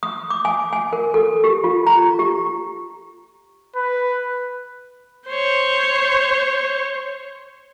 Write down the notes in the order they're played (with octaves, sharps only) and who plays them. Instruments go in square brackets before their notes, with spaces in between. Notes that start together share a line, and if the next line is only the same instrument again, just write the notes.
[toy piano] D#6
D6
G#5
G#5
A#4
A4
G4
F4
A#5
G4
[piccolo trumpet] B4
[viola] C5 C#5